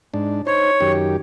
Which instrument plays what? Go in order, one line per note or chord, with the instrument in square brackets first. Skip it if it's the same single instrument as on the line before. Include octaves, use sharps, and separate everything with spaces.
[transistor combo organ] G#2 D4
[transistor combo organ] D#4 C5 [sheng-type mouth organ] C#5
[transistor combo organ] F#2 D#3 G4